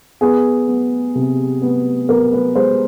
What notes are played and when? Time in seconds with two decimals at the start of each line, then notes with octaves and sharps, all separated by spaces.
0.21 B3 G#4
0.68 B3
1.15 C3
1.62 B3
2.09 B3 A#4
2.33 B4
2.55 G#3 C5